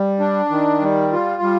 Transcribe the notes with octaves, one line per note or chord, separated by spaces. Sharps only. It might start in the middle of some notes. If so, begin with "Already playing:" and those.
Already playing: G3
D4
D#3
G3
F4
G3